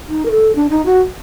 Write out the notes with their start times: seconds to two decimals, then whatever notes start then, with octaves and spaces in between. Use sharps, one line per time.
0.08 D#4
0.25 A#4
0.31 A4
0.55 D4
0.70 D#4
0.86 F#4